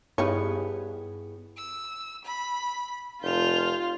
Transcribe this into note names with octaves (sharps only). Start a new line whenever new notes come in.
G2 G3 B3 D#4 E4 G4 G#4 C#5
E6
B5
F1 F4 G6 F7